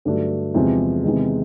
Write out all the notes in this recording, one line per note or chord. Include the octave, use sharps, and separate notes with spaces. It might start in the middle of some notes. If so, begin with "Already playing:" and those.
G2 D3 F#3 A3 D4
E2 C3 F3 G#3
E2 C3 D#3 G#3